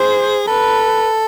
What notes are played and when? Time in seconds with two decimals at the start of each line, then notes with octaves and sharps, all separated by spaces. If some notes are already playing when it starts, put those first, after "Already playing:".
Already playing: G#4 C5
0.47 A4 B4